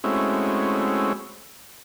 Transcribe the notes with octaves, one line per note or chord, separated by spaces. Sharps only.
G#3 A3 C4 C#4 E4 F#4